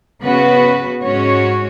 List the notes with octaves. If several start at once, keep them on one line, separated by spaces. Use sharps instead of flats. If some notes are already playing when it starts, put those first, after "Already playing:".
C#3 B3 F#4 B4
G#2 G#3 C#4 F#4 C#5